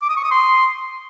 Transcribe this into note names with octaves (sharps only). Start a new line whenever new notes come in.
D6
D#6
C#6
D#6
C6